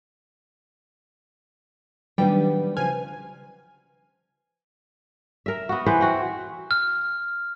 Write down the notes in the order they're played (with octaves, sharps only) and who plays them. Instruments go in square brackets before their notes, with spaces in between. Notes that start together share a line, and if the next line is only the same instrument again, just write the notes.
[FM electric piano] D#3 F#3 D4 [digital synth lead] G3 [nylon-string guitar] B3 B4 G5
[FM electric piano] C#3 F6 [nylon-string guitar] F3 B4 [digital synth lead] G#5
[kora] A#4 E5
B3 F#4
E3 B4 C5 F#5
C4 F#4
[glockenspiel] F6